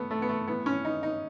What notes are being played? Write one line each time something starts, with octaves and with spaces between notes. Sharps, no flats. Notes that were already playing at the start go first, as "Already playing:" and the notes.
Already playing: A3 B3
A3
B3
A3
A2 E3 B3
C#4
D#4
D#4